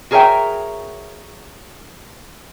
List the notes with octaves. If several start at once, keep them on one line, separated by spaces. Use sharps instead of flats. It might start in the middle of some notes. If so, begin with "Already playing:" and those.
F#4 G#4 A#4 C#5 E5 G5